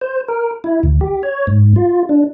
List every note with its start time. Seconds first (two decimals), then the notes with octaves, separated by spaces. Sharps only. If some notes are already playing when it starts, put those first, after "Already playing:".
0.01 C5
0.28 A#4
0.64 E4
0.83 D2
1.01 G4
1.23 C#5
1.47 G#2
1.76 F4
2.09 D4